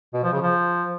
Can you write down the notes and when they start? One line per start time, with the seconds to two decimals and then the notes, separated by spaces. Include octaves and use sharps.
0.14 B2
0.23 F3
0.33 C#3
0.42 F3